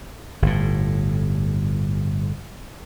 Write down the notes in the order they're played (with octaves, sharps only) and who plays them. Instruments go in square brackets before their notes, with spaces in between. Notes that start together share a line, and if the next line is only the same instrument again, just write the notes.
[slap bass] G1 A2